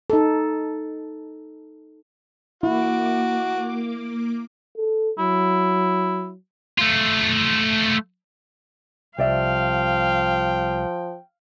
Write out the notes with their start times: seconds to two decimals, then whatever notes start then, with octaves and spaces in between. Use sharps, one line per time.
0.10 D#4 A4
2.63 A#3 E4 F#4 D6
4.77 A4
5.19 F#3 E4
6.78 A3 F4
9.18 C2 F3 D5 E5 F5 G5